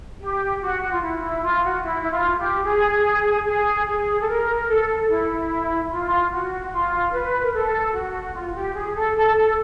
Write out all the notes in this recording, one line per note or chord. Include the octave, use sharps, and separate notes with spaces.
G4
F#4
F#4
F4
E4
E4
F4
F#4
E4
E4
F4
G4
G#4
G#4
G#4
A4
A#4
A4
E4
F4
F#4
F4
B4
A#4
A4
F#4
F4
G4
G#4
A4
A4
A4